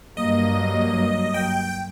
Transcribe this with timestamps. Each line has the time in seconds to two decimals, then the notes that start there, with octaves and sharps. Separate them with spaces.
0.17 G2 F#3 A#3 D#5
1.34 G5